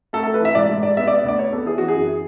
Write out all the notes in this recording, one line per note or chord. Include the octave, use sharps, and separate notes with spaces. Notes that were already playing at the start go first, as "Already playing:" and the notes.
A3 A4
A4
A3
B4
E3 E5
G#2 D5
G#2
G#2 D5
B3 E5
D5
B3
D2 D5
B3 C#5
B3 A4
E3 G#4
E3 F#4
G#4
F#2